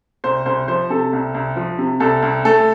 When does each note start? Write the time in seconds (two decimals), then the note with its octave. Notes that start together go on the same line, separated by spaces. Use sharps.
0.24 C2 C5
0.46 C2 C5
0.68 F3 C5
0.90 C3 A4
1.13 C2
1.34 C2
1.56 F3
1.78 C3
2.00 C2 A4
2.22 C2
2.45 A3 A4